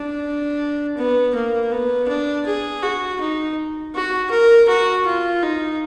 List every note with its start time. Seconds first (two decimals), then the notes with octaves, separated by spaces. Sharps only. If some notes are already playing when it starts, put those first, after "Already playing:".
Already playing: D4
0.97 B3
1.35 A#3
1.72 B3
2.08 D4
2.46 G#4
2.83 F#4
3.21 D#4
3.95 F#4
4.31 A#4
4.69 F#4
5.06 F4
5.43 D#4